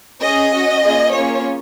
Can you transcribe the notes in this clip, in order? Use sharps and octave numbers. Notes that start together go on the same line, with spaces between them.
C#4 G#4 D#5
C#4 F#4
A#3 C#4 F4 G#4
A#3 C#4 F4 G#4 C#5